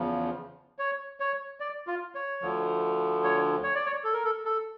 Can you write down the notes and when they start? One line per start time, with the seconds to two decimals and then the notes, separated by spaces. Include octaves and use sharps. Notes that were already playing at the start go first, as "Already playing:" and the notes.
Already playing: E2 C#3 F3
0.79 C#5
1.20 C#5
1.60 D5
1.87 F4
2.15 C#5
2.42 D2 D3 F3
3.24 C#5
3.63 C#5
3.75 D5
3.86 C#5
4.04 A4
4.14 A#4
4.24 A4
4.45 A4